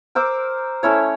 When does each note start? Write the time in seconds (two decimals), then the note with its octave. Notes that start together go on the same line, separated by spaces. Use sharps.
0.15 A#4 C5 D6 E6
0.83 A3 C#4 E4 C#5